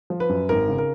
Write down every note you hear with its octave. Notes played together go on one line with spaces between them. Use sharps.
F3
B4
F#2
G#1 A#4
C#3
A#4